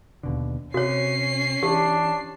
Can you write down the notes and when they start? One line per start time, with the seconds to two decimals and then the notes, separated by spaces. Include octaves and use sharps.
0.23 D#2 B2 D3
0.74 C3 C#4 F#4 C#5 C7
1.63 E3 D4 G4